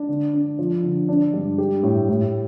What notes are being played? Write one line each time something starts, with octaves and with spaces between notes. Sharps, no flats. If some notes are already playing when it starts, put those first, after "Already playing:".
Already playing: D4
D3
D4
F3
D3
D4
G2
G4
A2
A2